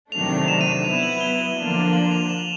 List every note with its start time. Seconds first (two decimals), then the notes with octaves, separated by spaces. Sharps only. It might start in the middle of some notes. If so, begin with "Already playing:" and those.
0.12 C3 D#3 F#3 A3 D4 F7
0.48 E7
0.61 D#7
0.72 E7
0.84 F#3 B3 E4 F7
1.03 F#7
1.21 G7
1.57 D3 F3 A#3 D4 F4
1.93 F#7
2.11 F7
2.29 E7